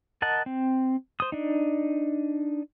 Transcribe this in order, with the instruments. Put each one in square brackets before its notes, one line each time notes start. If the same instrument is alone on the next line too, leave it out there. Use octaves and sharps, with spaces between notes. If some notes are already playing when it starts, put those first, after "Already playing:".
[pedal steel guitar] A#4 D#5 F#5 A5
C4
C5 D#6
D4 D#4